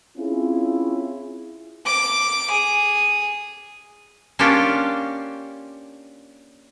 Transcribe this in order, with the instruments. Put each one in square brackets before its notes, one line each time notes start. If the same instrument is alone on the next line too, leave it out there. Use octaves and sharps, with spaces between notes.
[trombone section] C4 C#4 E4 F4 G#4
[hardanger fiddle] D6
G#4
[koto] A#3 C#4 D4 F4 G4